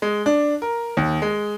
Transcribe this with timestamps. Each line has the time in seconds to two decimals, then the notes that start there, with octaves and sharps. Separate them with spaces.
0.02 G#3
0.26 D4
0.62 A#4
0.97 D#2
1.22 G#3